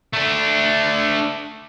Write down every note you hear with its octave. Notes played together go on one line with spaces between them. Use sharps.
A3 D4